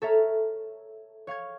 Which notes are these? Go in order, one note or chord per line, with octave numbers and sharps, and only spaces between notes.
A4 C#5 E5 A#5 C#6 F6
C#5 F5 C#6 G#6